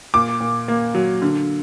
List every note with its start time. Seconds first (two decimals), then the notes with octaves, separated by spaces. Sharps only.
0.14 A#2 D6
0.41 A#2
0.68 A#3
0.95 F#3
1.22 D3